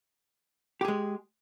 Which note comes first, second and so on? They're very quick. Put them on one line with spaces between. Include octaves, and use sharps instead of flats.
G4 G#4 G#3